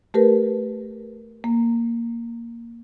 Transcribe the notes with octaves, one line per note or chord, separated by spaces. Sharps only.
A3 G4 A#4 B4
A#3